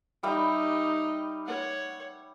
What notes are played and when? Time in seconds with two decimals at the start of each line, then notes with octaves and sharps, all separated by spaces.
0.23 G3 D#4 G4 E5 G5
1.46 C#5 F#5